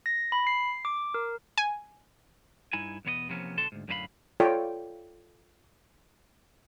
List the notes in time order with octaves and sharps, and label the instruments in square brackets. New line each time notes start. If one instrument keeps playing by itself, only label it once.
[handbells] A#6
B5
C7
D6
A#4
[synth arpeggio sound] G#5
[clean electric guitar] G2 D#4 E4 G#5
E2 B2 B3 C#5 D#5
C3 E3 F3 A#3 B3 C#4
B1 B2 D3 A4 A5 C6
D2 G#2
F#2 A2 D3 B4 F5 B5
[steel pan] F4 A4 C#5 D5 G5